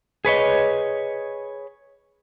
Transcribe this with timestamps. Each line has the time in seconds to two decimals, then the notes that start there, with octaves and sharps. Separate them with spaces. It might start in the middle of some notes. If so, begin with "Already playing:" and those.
0.25 G#4 B4 C#5 D#5